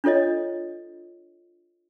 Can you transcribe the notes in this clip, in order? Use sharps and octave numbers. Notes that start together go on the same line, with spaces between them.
D4 F4 A4 C#5 D#5